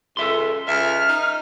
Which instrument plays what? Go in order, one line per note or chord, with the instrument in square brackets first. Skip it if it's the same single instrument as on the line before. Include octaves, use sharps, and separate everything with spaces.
[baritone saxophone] C#2 [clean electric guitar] A4 E5 C6
[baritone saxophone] C#2 [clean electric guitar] E5 [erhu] F6
[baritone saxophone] D#4